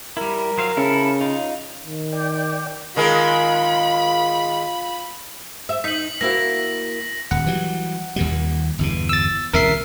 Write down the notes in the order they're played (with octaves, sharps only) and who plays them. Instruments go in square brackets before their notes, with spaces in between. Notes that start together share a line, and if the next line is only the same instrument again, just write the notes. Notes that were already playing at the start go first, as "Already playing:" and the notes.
[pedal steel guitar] G3 E4 [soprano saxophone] A#4
[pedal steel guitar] F#3 C5 F5
[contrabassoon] C#3 [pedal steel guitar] E4 A4
[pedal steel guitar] D#4 F4
[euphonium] D#3
[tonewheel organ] D5 G5
[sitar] D#3 G#3 A#4 [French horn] F4 [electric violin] B5
[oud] E5
[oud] D#4 [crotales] B6 F#7
[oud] A#3 E4 F#4 [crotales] A#6
[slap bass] D#1 [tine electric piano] F#5
[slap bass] E3 F#3 G3
D#2 A#2 G3
G1 E2 B2
[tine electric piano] E6 A6
[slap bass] D#1 C2 C#3 [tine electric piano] A#4 E5 C7